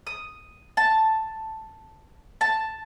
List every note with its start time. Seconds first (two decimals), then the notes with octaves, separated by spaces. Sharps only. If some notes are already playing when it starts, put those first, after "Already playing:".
0.07 D#6
0.77 A5
2.41 A5